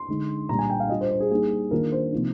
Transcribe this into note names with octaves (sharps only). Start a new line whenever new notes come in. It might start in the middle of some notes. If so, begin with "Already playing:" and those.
Already playing: C6
D3 G#3 D#4
A#2 G3 D4 A#5
G#5
G5
F5
G3 D4 F4 D#5
C5
C5
G#4
G3 A#3 D#4 G#4
D#3 A#3 D4 F4 A#4
C5
C3 F3 A#3 D#4